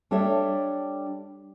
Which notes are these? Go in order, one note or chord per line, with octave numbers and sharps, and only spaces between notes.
G3 D4 A4 C#5 E5